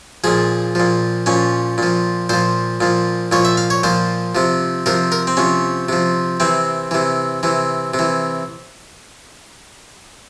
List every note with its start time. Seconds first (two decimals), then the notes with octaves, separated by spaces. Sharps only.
0.24 A#2 F3 G#4
0.75 A#2 F3
1.26 A#2 F3 C#4
1.78 A#2 F3
2.29 A#2 F3 C5
2.81 A#2 F3
3.32 A#2 F3 C#5
3.45 E5
3.57 F5
3.70 C#5
3.83 A#2 F3 C5
4.35 C3 F3
4.86 C3 F3 A#4
5.12 A#4
5.27 C4
5.37 C3 F3 C#4
5.89 C3 F3
6.40 C3 E3 C4
6.91 C3 E3
7.43 C3 E3
7.94 C3
7.99 E3